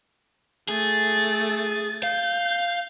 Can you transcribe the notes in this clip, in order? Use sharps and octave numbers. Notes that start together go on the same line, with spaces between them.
A3 G#4 A6
F5 G6